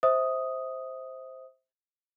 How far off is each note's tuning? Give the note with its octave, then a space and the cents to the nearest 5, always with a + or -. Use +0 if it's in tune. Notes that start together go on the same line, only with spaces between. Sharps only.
C5 +0 E5 -30 D#6 +0